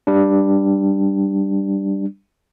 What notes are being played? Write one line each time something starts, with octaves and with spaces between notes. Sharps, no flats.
G3 D4